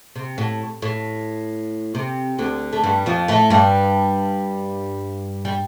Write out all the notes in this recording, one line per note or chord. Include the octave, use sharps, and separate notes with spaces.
C3
A2
A2
C3
D2 D3
A3
G2 G3
F2 F3
A2 A3
G2 G3
G3